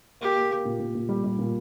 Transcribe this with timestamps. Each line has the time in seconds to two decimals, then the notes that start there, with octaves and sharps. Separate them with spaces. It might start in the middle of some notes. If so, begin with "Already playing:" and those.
0.21 A#3 G4
0.36 A#3
0.51 A#3
0.65 A#2
0.79 A#2
0.95 A#2
1.09 G3
1.24 G3
1.39 A#2